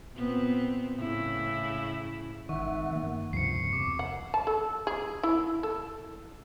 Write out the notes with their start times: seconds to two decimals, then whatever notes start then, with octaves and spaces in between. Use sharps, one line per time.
0.15 A#2 B3 C4
0.96 A2 C#3 E4
2.49 G#1 D#3 E5 F#5 C#6
2.91 D#3 A#3
3.03 G2
3.33 C#2 G2 C3 F3 C7 C#7
3.73 E2 C3 D6
3.99 F#5
4.34 A5
4.47 A4
4.87 G#4
5.23 E4
5.63 A4